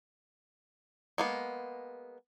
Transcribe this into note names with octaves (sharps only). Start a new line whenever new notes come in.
G#3 A#3 B3